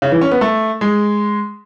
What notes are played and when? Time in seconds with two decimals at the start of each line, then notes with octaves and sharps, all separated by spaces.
0.02 C#3
0.12 E3
0.21 C#4
0.31 B3
0.41 A3
0.81 G#3